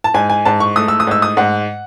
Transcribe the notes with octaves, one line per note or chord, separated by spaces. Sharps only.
A5
G#2 G#5
G#5
G#2 A5
C#6
A3 D#6
E6
D#6
G#2 E6
D#6
G#2 F#5